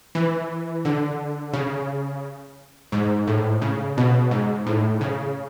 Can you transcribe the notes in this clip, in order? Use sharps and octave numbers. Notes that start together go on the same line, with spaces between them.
E3
D3
C#3
G#2
A2
C#3
B2
G#2
A2
C#3